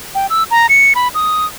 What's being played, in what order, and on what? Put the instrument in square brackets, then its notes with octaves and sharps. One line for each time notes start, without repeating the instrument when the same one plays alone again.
[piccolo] G5
E6
A#5
C#7
B5
D#6